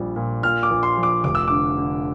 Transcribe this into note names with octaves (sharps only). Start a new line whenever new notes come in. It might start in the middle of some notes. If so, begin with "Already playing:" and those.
Already playing: A#1 G3
A#2
A#2 F6
D6
A#1
C6
F3
D6
F1 D6
E6
D3 D6
D3